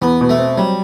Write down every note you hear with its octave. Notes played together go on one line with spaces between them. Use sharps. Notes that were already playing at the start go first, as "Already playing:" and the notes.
E2 B3
B2
A3
C4
F#3 G3